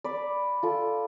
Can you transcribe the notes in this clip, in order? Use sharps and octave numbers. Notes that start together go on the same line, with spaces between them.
D5 B5
F4 A4